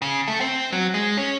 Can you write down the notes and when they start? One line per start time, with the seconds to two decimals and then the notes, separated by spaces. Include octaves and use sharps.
0.02 C#3
0.28 A3
0.41 C4
0.73 F#3
0.94 G#3
1.17 C#4